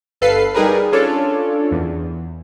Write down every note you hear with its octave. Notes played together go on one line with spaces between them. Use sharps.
G1 A4 B4 F5 C7
G3 D#4 G#4 A#4 B4
C#4 D4 F4 A4 C#5 D5
E2